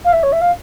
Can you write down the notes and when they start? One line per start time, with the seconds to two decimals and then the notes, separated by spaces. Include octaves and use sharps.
0.05 F5
0.12 E5
0.23 C#5
0.32 E5
0.41 F5